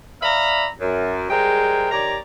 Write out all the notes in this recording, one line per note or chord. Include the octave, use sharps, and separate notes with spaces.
D5 E5 F5 A#5 B5
F#2
G3 G#3 G#4 A#4 C5 G5
D#3 G4 C#5 D5 A#5